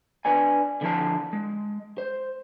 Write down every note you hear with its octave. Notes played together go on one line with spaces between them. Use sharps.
D4 B4 D5 G#5
D3 F3 E4 A5
G#3
C5